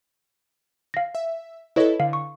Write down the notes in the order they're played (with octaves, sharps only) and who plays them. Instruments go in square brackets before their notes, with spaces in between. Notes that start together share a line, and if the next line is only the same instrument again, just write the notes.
[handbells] F5 A#6
[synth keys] E5
[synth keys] E4 A4 [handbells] B4 C#5 D#5
[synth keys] D3 [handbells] F5
[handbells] C#6